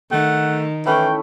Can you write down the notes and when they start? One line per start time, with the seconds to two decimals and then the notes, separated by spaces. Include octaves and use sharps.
0.12 D#3 A3 F#5
0.86 E3 A3 C#4 E4 G5